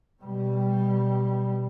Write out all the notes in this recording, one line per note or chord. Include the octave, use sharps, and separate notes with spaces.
B2 G3